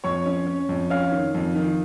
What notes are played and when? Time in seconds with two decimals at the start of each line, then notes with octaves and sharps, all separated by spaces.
0.04 F2 C#5 C#6
0.26 C#4
0.47 C#4
0.69 F2
0.90 C#4 F5 F6
1.12 D#3
1.34 F2
1.55 D#3